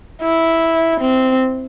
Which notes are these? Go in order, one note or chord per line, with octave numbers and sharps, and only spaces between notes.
E4
C4